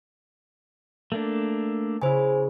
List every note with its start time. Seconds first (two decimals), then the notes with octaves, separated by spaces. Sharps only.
1.12 A3 A#3 D4
2.02 C#3 E4 C5 G#5